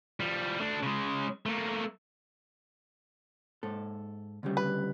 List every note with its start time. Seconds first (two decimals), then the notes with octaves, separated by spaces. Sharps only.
0.20 F3 G3
0.60 A3 D4
0.83 C#3 G#3
1.46 A3 A#3
3.63 G#2 A4
4.43 D2 C#3 G3
4.57 B4